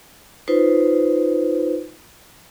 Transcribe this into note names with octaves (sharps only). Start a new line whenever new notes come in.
D#4 F4 B4 C5